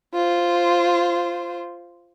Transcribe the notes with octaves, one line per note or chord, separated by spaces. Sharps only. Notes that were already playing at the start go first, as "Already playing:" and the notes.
F4 C5